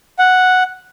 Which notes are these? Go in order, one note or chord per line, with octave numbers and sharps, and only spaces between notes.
F#5